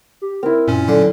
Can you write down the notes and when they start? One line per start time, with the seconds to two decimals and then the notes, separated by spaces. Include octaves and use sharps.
0.22 G4
0.43 C4 E4 A#4
0.68 F#2 A#2 C#4
0.88 D3 F#3